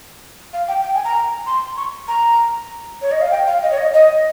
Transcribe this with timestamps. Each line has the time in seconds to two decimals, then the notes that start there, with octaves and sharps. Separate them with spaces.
0.53 F5
0.68 G5
0.83 G5
0.95 G#5
1.05 A#5
1.46 C6
1.77 C#6
2.08 A#5
3.02 C#5
3.12 D#5
3.21 F5
3.31 G5
3.47 F5
3.63 D#5
3.71 C#5
3.78 D#5
3.94 D#5